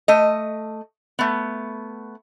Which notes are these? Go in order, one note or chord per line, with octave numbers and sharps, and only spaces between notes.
A3 D#5
A3 B3